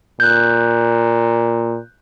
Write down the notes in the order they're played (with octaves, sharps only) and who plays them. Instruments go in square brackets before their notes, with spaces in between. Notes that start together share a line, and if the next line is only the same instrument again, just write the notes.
[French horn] A#2 [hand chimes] F#6 G6